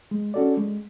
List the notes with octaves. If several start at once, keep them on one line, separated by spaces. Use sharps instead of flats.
G#3
C#4 F#4 A4 D5
G#3